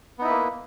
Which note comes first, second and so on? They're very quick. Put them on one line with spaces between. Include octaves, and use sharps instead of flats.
B3 D#4 E4 B4 A#3